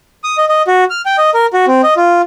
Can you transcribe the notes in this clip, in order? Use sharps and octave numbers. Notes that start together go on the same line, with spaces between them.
D#6
D#5
D#5
F#4
F6
G5
D#5
A#4
F#4
C4
D#5
F4